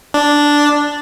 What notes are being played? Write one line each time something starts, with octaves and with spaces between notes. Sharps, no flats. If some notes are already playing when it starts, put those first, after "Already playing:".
D4